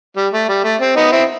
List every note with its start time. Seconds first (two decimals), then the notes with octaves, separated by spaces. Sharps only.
0.16 G3
0.33 A3
0.49 G3
0.64 A3
0.81 C4
0.97 B3 D#4
1.12 C4 E4